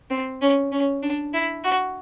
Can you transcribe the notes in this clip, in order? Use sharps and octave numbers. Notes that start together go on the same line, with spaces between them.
C4
C#4
C#4
D4
E4
F#4